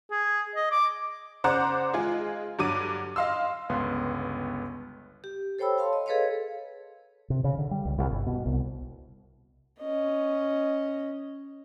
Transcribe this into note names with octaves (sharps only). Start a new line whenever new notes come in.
G#4
D#5
D6
C#3 C5 D5 F#5 A#5 D6
G#3 F4 G#4
G2 D3 F#3 D6 D#7
D#5 F5 C6 E6
G1 C#2 B3 C6
G4
A4 C5 C#5 G5 B5 E6
C#5 F5 A5 C6
D#5
G#4 A4 B4 C#5 D#5 F5
C3
C#3
D3
G3
C#2
C2
G1
B2
C2
C#4 D#5